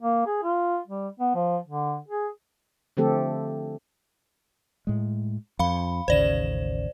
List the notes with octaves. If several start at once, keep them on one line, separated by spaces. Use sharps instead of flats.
A#3
G#4
F4
G3
B3
F3
D3
G#4
D3 F3 A3 C4 G4 A4
A2 G#3
F2 F5 B5
A1 D#2 C#3 C5 D5 E7